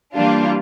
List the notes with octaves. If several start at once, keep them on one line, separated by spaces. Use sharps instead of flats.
E3 G3 A#3 D4 F4